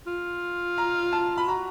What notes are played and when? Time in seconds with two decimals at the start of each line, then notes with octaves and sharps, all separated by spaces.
0.07 F4
0.78 A#5
1.13 A5
1.37 B5
1.48 F#4 A#5